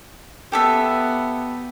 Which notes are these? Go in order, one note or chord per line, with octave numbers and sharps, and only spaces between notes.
B3 G4 A4 E5